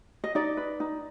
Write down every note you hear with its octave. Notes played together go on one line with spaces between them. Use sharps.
D#5
D#4 D5
B4
D#4